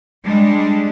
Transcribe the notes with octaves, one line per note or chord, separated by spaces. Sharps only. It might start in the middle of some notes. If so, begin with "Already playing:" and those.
G3 G#3 D4